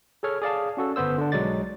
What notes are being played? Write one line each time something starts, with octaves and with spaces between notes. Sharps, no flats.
G#4 A4 C#5 F6
G#4 D5 F5 A5
C#4 F#4 A4
G1 B3 C5 E6
D3 D4
B1 F#3 G#3 D5 A6